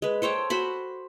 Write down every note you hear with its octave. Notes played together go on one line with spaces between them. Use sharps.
G#3 B4
A4 C5 C#5 G5
F#4 C5 B5